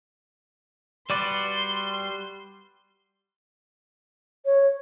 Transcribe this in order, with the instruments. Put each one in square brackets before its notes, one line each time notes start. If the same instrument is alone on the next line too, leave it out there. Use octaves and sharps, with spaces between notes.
[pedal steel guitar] G3 F#4 B4 [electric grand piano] D5 D6 A6 [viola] C6
[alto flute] C#5